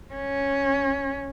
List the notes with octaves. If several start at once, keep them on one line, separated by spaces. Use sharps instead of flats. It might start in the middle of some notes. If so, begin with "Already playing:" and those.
C#4